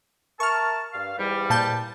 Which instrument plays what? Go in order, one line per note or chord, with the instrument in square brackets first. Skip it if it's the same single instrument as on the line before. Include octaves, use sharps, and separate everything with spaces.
[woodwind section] A#4 E5 A5 [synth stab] C#6 F6
[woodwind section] G2 F5
E2 G#2 G3
[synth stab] A#2 A5 G6